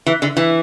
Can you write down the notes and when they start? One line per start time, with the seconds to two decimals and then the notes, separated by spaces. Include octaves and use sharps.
0.06 E3
0.22 D3
0.37 E3